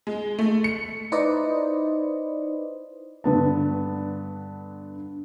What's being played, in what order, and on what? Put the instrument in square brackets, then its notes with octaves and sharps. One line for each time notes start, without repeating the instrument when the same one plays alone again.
[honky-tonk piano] G#3
A3
C#7
[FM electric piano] D#4 E4 B4 C5 D5 D#5
[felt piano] G2 D3 B3 A5